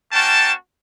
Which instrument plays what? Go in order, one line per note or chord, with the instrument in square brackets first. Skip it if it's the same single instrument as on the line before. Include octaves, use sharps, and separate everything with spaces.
[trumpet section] A#3 C#4 F#4 G5 A5